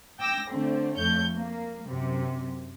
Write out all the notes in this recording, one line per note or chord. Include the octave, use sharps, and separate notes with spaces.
G5 D6 E6 A#6
D3 A3 C4
F2 A3 C#5 G6
A#3
F#2 C3